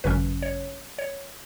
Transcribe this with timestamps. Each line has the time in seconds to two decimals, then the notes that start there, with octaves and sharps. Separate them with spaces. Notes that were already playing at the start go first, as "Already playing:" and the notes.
0.04 G#1 F#2 C#3 F#3 C#4 B4
0.42 C#5
0.99 C#5